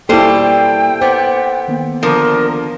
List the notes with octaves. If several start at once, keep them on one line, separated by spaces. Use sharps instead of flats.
B2 G3 A#3 E4 A4 C5 G5
B3 C5 D6 A6 B6
D#3 A#3 B3
D3 F3 A#4